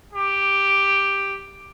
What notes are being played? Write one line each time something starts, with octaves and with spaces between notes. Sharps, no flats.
G4